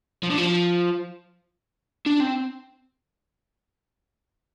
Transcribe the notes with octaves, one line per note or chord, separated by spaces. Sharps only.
F3
D3
F3
D4
C4